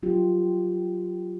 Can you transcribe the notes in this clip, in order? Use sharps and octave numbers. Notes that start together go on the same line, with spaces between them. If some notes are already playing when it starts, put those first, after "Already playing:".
F#3 F4 G4